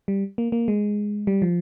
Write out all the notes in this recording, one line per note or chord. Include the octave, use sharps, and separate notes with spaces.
G3
A#3
A#3
G#3
G3
F3